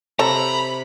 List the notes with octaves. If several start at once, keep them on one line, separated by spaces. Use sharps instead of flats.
C3 A4 C#5 A#5 B5